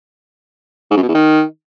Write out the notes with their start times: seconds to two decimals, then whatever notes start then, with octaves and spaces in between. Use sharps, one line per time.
0.91 G#2
0.97 F#2
1.03 B2
1.08 E2
1.14 D#3